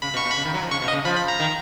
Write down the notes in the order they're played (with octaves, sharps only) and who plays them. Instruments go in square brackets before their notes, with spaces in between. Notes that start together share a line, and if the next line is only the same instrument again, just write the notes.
[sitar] C#3 [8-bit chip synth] B5
[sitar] B2
[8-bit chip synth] C#6
[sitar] B2
[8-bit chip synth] B5
[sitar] C#3
D#3
F#3
F3
[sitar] C#3 [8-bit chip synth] C#6
[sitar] B2
[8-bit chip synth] D#5
[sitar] C#3
[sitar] F3 [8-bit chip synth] B5
[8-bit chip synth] B5
A#5
[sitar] D#3